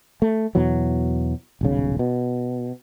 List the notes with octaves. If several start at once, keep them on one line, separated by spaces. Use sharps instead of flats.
A3
E2 B2 E3 F#3
D#1 B1 C#3
B2